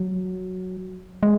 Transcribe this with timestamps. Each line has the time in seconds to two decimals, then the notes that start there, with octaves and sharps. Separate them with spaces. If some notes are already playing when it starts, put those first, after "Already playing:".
Already playing: F#3
1.23 G#3